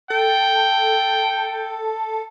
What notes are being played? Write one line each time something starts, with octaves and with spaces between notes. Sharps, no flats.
A4 G5